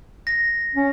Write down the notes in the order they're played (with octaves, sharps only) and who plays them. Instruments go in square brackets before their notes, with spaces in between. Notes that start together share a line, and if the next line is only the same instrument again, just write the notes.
[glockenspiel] A#6
[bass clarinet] C#4